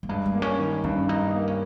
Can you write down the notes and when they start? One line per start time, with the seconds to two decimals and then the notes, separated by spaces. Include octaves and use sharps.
0.03 A#3
0.09 G2 G#3
0.26 G#3
0.34 A#3
0.42 C#4
0.59 D#3
0.84 G2 C#4
1.09 G2 D#4
1.34 A#3
1.48 C#4